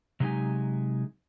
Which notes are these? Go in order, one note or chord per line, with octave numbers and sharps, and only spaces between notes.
C3 F#3 G#3 D#4 G4 G#5